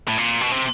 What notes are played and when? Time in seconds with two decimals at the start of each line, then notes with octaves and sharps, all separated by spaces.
0.08 A2
0.18 A#2
0.41 B2
0.51 C3